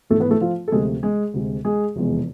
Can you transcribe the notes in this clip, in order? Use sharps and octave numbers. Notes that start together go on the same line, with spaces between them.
G#1 G#2 E3 A3 A4
B3 B4
A3 A4
F3 F4
A4
D2 C3 F3 G#3 A3 G#4
G#3 G#4
D2 C3 G#3
G#3 G#4
F1 E2 B2 G#3